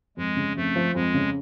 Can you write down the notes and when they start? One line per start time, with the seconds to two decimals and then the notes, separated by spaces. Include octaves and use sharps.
0.17 F2 G#3
0.37 C#3
0.56 F2 A3
0.76 F3
0.95 F2 G#3
1.14 C#3